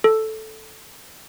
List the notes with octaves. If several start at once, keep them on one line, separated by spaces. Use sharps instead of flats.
A4